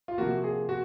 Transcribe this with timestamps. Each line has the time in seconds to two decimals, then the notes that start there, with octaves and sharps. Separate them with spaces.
0.08 F4
0.18 C3 F3 A#3 F#4
0.44 G#4
0.69 F#4